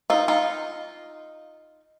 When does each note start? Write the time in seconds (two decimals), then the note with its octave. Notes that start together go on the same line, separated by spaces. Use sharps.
0.10 D#4 F4
0.28 D#4 F4